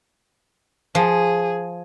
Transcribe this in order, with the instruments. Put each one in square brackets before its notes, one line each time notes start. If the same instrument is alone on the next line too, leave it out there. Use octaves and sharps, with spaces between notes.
[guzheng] F3 [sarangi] G#4